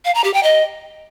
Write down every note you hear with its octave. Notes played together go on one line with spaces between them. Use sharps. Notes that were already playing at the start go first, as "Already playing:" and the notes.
F5
A#5
G4
G5
D#5